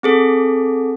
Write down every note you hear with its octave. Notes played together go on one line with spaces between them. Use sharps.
C4 G#4 A4